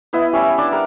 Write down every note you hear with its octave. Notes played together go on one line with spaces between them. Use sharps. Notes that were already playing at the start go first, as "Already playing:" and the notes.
B3 E4 D#5
G3 C#4 E5
D4 D5
G3 A#4 F#5